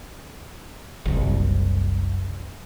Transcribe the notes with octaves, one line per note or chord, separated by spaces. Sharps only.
F#1 C2